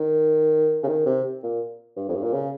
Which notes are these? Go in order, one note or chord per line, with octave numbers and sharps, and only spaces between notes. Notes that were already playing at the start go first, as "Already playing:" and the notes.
Already playing: D#3
C#3
D#3
C3
A#2
G2
F2
G2
A#2
C#3